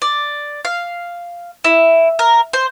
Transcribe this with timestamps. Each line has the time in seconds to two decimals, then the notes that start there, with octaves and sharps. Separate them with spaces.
0.02 D5
0.65 F5
1.64 E4
2.19 A#4
2.53 C5